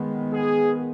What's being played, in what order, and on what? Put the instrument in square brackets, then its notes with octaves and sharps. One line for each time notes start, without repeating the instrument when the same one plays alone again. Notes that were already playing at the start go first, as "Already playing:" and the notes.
Already playing: [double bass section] D#3 G#3 B3
[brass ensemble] G#4